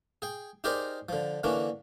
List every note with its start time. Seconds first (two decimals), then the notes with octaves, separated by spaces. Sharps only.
0.22 G#4 G5
0.64 D#4 G4 G#4 A#4 C5 D5
1.09 D3 F3
1.44 D3 E3 A#3 C#4 D4